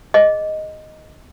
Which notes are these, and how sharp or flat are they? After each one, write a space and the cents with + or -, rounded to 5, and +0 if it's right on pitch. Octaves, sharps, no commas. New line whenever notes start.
G#4 +0 D#5 +0